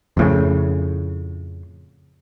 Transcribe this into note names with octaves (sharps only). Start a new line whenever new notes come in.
F2 A2 C#3